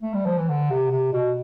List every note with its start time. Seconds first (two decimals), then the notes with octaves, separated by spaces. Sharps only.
0.02 A3
0.14 G3
0.26 F3
0.38 E3
0.49 D3
0.71 C3
0.91 C3
1.12 B2